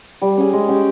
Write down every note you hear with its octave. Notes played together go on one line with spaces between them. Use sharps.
G3
C#4 G#4
G#3
C#4 G4